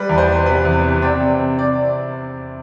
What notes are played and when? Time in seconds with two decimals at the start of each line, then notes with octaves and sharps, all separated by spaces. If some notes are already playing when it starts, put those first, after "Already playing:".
Already playing: G3 B4
0.09 E2
0.18 C5
0.28 B3
0.46 C3 B4
0.65 E2
0.84 C3
1.02 C4 D5
1.20 C3
1.39 C3
1.58 C4 D5